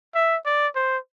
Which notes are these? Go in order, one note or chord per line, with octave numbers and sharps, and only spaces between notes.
E5
D5
C5